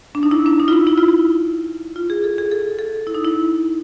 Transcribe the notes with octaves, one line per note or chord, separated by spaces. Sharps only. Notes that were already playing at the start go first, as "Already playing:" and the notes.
D4
D#4
E4
D4
D#4
F4
E4
E4
F4
E4
F4
G#4
A4
G#4
A4
A4
E4
D#4
E4